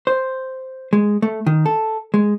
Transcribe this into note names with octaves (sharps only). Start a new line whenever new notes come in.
C5
G#3
A3
D#3
A4
G#3